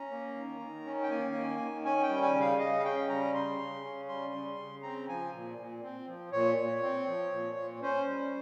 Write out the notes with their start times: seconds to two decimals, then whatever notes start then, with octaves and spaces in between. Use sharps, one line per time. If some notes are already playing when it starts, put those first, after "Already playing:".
Already playing: C#4 A#5
0.10 A#3
0.35 D#3
0.60 D#3
0.85 C#4
1.03 G5
1.10 A#3 G#5
1.35 D#3
1.59 D#3
1.84 C#4 G#5
2.03 G5
2.09 G3
2.22 G#5
2.34 C#3
2.40 F5
2.59 C#3 D#5
2.79 F5
2.84 C#4 G5
3.09 G3 A#5
3.34 C#3 C6
3.59 C#3
3.84 C#4
4.08 G3 C6
4.33 C#3
4.58 C#3
4.83 C4 A#5
5.08 F3 G#5
5.33 A#2
5.58 A#2
5.83 C4
6.07 F3
6.32 A#2 C#5
6.57 A#2
6.82 C4
7.07 F3
7.32 A#2
7.57 A#2
7.82 C#4 C5
8.07 G3